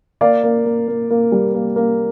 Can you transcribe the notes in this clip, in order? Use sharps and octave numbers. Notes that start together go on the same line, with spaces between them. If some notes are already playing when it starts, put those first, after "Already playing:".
A#3 D5 F5
A#3
A#3
A#3
A#3
G3
A#3
A#3